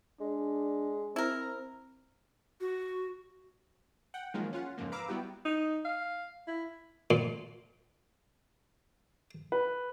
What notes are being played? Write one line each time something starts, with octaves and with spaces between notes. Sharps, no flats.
G#3 D4
C4 E4 A#4
F#4
F#5 G5
D#3 F3 F#3 G#3 A#3 F4
C#4 F4 F#5
F2 G#2 C#3 F3 A#3
B4 F5 A#5 D6 E6
G3 B3 E4 F#4 G4
D#4
F5
E4
A#2
B4